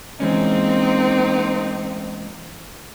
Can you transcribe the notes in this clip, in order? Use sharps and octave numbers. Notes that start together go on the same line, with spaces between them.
E3 G#3 A#3 C4 C#4 D#4